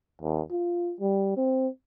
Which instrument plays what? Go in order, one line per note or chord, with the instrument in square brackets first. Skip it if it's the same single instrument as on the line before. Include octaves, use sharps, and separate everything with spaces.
[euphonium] D#2
F4
G3
C4